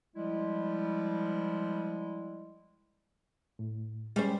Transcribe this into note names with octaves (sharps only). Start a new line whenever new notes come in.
F3 G3 G#3 E4
A2
G3 G#3 C#4 G4 C5